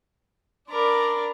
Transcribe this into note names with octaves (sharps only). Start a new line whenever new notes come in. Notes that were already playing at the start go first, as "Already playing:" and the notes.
D4 A#4 D5 A#5 B5